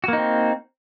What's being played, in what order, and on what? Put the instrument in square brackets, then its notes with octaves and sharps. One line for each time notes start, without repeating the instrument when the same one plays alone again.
[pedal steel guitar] F#4
A#3
D#4
C4